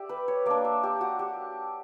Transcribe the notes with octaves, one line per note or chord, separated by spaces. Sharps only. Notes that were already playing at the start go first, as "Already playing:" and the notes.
Already playing: G4 D5 E5
B4
C#5
A#3 D4 D5
E5
G4
F#4
G4